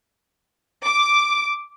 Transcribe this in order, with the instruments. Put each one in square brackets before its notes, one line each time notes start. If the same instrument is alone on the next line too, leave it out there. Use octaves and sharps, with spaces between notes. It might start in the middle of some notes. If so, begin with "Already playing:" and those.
[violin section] D6